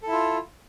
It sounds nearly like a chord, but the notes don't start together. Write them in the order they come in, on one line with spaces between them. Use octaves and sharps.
A4 E4 F4